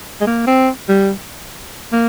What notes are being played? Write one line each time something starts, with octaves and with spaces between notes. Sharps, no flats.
G#3
A#3
C4
G3
A#3